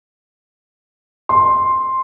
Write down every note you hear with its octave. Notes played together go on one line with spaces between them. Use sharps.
C6